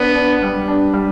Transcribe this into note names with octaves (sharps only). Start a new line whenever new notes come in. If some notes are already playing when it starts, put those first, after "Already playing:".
Already playing: B3 D4
D4
G3
D4
G3